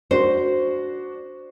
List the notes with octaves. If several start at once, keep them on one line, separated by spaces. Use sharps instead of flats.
D4 F#4 C5